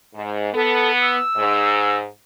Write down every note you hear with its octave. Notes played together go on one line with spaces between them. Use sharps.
G#2
B3 A4
E6
G#2